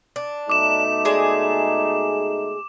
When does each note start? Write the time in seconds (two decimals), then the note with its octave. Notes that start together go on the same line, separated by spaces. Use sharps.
0.16 D4
0.50 B2 A3 D#4 D6 E7
1.05 G#3 G#4 D5